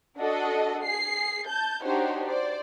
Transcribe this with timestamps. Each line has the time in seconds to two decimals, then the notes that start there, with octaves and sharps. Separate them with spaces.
0.18 D4 F#4 A4 D#5
0.84 G#4 C7
1.48 A5 G6
1.83 D4 D#4 F#4 G4 C5 C#5
2.28 C5 D5